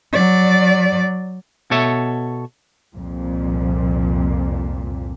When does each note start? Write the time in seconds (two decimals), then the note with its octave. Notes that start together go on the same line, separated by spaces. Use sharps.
0.13 F#3 D5
1.71 B2 A4 C#5 E5
2.94 C2 F2 A#2